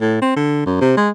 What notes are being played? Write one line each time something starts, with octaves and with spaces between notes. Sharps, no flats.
A2
C4
D3
F#2
C3
G#3